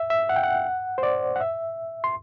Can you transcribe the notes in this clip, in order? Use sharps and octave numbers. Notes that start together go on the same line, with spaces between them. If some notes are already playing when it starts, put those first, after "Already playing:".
Already playing: E5
E5
F#5
G5
F#5
C5
D5
F#5
E5
C6